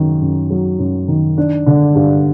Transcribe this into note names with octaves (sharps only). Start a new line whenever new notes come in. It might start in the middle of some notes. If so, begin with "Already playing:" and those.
Already playing: F#2 D#3
F#2
F#3
F#2
D#3
D4
D3
G2